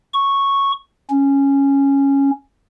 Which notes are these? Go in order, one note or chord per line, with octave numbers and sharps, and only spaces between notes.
C#6
C#4